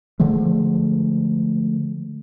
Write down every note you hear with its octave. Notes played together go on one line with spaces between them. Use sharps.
D3 F3 G#3 A3